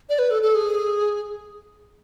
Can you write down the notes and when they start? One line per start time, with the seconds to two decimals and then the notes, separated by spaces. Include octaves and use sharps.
0.09 D5
0.19 B4
0.31 A4
0.42 A4
0.55 G#4